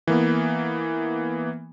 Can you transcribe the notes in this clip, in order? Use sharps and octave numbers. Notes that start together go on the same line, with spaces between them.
E3 A#3 B3